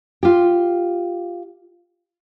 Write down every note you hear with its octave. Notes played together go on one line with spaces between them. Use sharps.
F4 G4